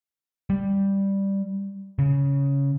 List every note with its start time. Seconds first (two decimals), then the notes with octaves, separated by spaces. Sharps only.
0.50 G3
1.99 C#3